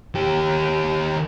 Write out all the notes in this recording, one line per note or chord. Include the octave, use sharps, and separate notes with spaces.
D#3 G4